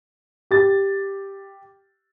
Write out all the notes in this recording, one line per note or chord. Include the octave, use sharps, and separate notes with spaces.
G4 A6